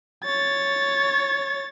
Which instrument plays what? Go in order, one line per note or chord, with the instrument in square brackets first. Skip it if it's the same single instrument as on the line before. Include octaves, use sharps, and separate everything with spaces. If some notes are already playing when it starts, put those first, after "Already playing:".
[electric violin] C#5 A6